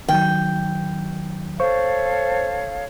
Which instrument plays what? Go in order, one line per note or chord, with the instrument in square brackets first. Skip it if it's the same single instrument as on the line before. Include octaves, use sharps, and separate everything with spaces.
[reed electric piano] D#3 F#3 [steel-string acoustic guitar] G5
[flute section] A4 C#5 F5 [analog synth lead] C5 [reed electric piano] C#6